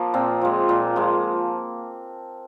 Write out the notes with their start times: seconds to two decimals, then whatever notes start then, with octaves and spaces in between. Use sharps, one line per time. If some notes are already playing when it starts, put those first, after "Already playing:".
Already playing: F3 A#3
0.14 A#2 C4
0.41 F3 G#3
0.69 A#2
0.96 F3 G#3